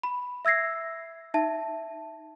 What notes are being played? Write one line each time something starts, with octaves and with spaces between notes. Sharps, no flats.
B5
E5 E6 G#6 A#6 C7
D#4 E5 A5